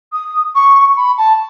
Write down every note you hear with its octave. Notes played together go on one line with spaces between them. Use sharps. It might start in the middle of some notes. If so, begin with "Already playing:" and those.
D#6
C#6
B5
A5